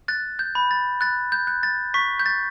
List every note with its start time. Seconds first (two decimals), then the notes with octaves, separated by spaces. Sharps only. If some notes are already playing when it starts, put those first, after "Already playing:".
0.08 F#6 A6
0.39 G6
0.55 B5
0.71 A6
1.01 F#6 A6
1.32 G6
1.47 F#6
1.63 A6
1.94 C#6 B6
2.20 G6
2.26 A6